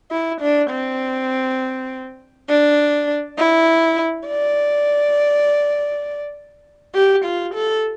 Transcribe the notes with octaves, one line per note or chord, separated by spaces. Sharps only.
E4
D4
C4
D4
E4
D5
G4
F4
A4